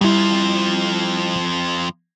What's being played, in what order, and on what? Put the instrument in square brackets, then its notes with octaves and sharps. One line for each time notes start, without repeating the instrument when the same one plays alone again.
[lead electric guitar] F2 F3 [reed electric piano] G3 E4